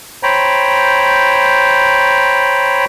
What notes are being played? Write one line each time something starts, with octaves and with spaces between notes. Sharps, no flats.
C5 C#5 G5 A#5 B5